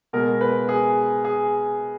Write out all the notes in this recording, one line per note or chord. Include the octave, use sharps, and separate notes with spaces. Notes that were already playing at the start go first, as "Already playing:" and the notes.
B2 G#3 A#4
B4
G#4
G#4